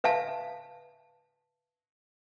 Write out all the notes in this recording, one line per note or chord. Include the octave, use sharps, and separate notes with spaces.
B4 E5 F5 A5